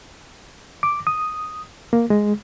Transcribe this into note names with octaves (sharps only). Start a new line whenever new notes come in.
D6
D#6
A#3
G#3